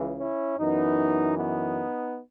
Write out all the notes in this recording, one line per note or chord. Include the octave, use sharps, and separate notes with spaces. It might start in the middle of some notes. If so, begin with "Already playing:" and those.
Already playing: C#2 C#3 E3
C#4 E4
F#2 E3 B3 D#4
B3 D#4